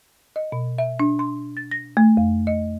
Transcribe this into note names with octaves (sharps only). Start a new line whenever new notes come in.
D#5
B2
E5
D4
C6
A6
A#6
A3
F2
D#5